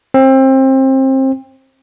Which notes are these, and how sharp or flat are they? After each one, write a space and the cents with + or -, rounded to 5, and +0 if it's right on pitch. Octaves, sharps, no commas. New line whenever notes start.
C4 +25